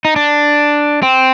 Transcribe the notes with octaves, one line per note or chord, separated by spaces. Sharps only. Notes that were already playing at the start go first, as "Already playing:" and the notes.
D#4
D4
C4